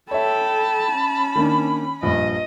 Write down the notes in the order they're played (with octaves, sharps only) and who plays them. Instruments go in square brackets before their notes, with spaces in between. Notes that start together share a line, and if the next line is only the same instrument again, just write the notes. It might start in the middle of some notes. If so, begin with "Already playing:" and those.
[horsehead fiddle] A4 G5 [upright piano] C#5 E5 [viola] A5 [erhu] B5
[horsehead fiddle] C#4
[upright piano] D#3 A#3 D4
[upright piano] A#1 G2 [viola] D#5